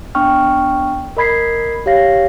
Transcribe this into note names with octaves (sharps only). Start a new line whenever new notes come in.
B3 D4 G5 C#6 F6
A#4 D#5 B5 G#6 B6 C7
G4 C#5 F5 A#6 C7